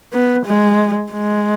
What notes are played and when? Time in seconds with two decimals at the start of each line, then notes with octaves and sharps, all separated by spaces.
0.13 B3
0.45 G#3
1.12 G#3